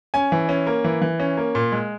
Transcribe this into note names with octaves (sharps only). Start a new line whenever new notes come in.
C#4 G#5
E3
C#4
A#3
E3
E3
C#4
A#3
A#2
G#3